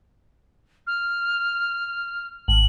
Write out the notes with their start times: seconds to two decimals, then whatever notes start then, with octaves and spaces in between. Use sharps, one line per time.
0.87 F6
2.48 G#1 F#7